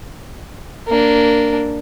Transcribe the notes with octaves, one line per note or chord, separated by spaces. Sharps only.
A#3 D4